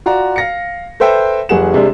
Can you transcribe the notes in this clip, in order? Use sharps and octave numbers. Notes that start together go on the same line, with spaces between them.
F4 F#4 D5 A#5
F5 A#6 C#7
A4 B4 C5 E5 G5
F1 G3 G#4 F#5 E7
C3 G3 G#3 D4